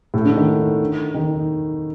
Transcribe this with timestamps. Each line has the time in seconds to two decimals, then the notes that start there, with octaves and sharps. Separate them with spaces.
0.14 A2
0.25 D3
0.36 D#3
1.14 D#3